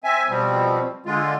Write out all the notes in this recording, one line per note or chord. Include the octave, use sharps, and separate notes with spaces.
C4 E5 G#5
B2 F3 G3 C4
D3 G#3 F4